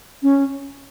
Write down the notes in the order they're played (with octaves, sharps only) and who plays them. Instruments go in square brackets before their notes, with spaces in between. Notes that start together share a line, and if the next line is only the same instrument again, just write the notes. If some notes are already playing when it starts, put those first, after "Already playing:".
[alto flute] C#4